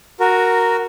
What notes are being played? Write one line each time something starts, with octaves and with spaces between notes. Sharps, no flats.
F#4 A#4